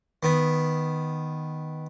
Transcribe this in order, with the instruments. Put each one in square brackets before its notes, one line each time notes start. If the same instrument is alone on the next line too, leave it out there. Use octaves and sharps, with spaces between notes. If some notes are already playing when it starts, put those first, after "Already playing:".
[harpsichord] D#3 B3